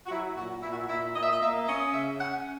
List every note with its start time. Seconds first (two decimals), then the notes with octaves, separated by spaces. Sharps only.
0.06 F#4
0.10 F#3 E4
0.36 A#2 F#4
0.62 A#2 E4
0.70 F#4
0.78 E4
0.89 A#2 E4
1.16 A#2 D#5
1.22 E5
1.30 D#5
1.41 A#3 E5
1.67 C#4 D#5
1.93 C#3 E5
2.20 C#4 F#5